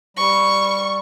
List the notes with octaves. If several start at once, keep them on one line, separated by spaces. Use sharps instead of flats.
G3 C#6